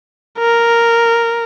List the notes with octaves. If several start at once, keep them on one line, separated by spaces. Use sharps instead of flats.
A#4